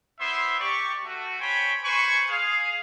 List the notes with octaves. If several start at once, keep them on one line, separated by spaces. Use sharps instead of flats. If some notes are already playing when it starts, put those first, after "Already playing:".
B3 E4 C5 E5 C6
G4 D5 C#6
A3 F#4
C5 C#5 G5 G#5 B5 C#6
B4 C5 G#5 B5 C#6
G#4 F5